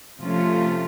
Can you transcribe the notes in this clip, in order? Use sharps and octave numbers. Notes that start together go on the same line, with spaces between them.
C3 F3 A3 C#4 F4